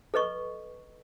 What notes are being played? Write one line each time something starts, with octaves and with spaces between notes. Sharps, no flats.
A4 B4 D#5 C#6